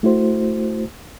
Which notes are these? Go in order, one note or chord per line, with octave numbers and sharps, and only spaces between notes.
A3 E4 F#4 C5